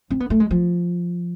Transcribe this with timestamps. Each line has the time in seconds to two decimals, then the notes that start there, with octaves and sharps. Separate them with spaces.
0.10 C4
0.20 B3
0.30 A3
0.40 G#3
0.51 F3